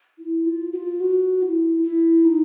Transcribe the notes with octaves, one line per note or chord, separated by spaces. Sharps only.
E4
F4
F#4
F4
F#4
E4
E4
D#4